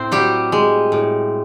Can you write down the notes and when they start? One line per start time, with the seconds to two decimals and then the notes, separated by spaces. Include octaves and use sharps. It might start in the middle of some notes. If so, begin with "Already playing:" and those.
Already playing: A2 C4 C5
0.11 F#3 G3 G4
0.52 G#3
0.92 A2